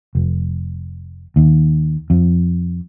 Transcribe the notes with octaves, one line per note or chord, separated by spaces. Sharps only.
F1
D#2
F2